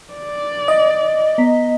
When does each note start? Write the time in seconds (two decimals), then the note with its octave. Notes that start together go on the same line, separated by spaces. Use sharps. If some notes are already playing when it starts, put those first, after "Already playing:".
0.14 D5
0.68 D#5
1.38 B3 A#5 B6